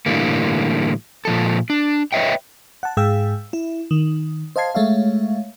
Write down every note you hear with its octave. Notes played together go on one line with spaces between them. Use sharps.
A2 D3 E3 G3 A#3
A#2 F3 A4
D4
B4 C#5 D#5 E5 G5
F#5 A5
G#2 G#4 F5 G5 E6
E4
D#3
C5 D#5 F5 A5 G#6 C7
G#3 A3 C#5 E5 F5